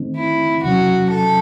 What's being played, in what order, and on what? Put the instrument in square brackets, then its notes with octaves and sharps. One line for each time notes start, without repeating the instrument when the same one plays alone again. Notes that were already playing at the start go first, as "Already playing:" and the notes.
Already playing: [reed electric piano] D#3 A3 C4 D#4
[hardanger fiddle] E4
[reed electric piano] E2 C3 F#3 C#4 [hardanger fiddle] F#4
[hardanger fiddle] A4